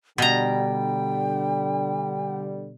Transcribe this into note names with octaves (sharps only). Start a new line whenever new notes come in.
B2 D3 G3 G5 A#5